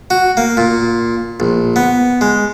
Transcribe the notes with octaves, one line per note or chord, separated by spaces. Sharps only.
F#4
A#3
A#2
A#1
B3
G#3